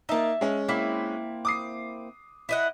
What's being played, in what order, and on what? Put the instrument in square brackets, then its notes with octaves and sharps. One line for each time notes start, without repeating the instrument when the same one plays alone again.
[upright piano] A#3 D#4 [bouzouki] E5 A5
[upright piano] G#3 C#4
[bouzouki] A#3 C4 E4
[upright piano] D6 D#6 C7
[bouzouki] E4 D#5 F#5